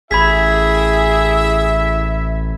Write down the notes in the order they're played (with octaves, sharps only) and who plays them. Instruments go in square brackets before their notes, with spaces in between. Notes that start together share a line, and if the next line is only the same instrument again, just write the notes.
[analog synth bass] A1 [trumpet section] E4 E5 [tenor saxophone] G#4 [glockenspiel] B5 G#6 B6